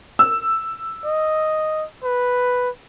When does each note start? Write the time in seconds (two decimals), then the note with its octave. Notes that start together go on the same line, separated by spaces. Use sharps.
0.19 E6
1.05 D#5
2.04 B4